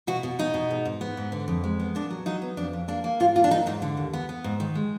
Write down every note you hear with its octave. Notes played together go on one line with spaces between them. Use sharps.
B2 F#4
B2
B2 D#4
B2
G#2
G#2
B3
G#2
D3
F2
G#3
B3
A#2 D4
F#3
F#3 D#4
B3
F2 D4
F2
A#3 D4
A#3
G#2 F4
A#3 F4
D4
F#3 D#4
G#2 D#4
D3
D#2
B3
B3
G#2
D#3
G#3